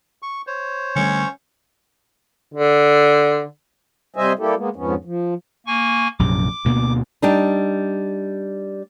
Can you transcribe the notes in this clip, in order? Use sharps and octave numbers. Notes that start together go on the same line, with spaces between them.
C#6
C5 C#5
D3 G3 A3 C#4
D3
C3 G3 C5 D#5 E5 G#5
G3 A#3 E4 G4 A4
G#3 A#3 B3
F2 G#2 F3 B3 C#4
F3
A#3 G#5 C#6
A#1 F#2 C3 D6
D2 B2 A#3
G3 D4 D#4